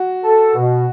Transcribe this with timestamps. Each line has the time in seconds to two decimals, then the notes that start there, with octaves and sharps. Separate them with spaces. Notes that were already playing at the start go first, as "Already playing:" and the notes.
Already playing: F#4
0.24 A4
0.55 B2